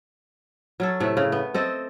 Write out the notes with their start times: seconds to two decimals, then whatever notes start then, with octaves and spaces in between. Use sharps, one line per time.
0.80 F#3 C#4 A4
1.00 A2 C3 A3
1.17 C#3
1.32 B3
1.54 C4 A4 D#5